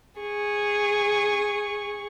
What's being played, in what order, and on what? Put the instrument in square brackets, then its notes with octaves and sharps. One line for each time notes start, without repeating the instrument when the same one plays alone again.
[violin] G#4 C#6